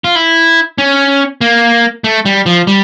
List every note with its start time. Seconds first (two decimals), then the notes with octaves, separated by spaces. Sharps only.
0.04 F4
0.15 E4
0.78 C#4
1.41 A#3
2.04 A3
2.25 G3
2.46 F3
2.67 G3